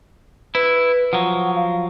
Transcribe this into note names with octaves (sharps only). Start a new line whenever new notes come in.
E4 B4
F3 F#3 F#5
F5